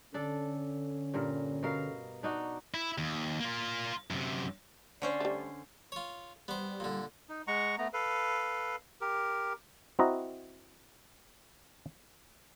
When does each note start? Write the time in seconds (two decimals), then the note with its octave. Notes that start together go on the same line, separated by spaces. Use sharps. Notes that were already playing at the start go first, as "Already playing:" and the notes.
0.14 D3 C#4 D4 A4
1.14 G2 A#2 A#4
1.63 B2 A#4 F5
2.23 D4 D#4 F#4
2.74 E4
2.98 D#2
3.40 A#3 F4
4.11 F#2 C3
5.02 D3 C#4 C5 D5
5.20 G3 A3
5.92 F4 C#5
6.48 G3 B3 C5
6.80 A#2 D3
7.29 D#4
7.47 G#3 F#5 A#5 C#6
7.78 A3 B3 A#5
7.93 A4 B4 F5
9.01 G4 A#4
9.99 C4 E4 F#4 D#5 A#5